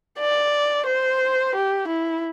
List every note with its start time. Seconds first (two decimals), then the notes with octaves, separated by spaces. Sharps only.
0.20 D5
0.86 C5
1.55 G4
1.88 E4